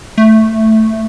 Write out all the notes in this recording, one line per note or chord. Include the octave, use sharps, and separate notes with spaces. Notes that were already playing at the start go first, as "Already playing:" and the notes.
A3